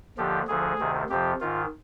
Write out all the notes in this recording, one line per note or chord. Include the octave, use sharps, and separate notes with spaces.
D#2 D3 F3 G4
D2 D3 F3 G#4
D2 C3 D#3
F2 C3 F3 G4
G#2 D#3 F4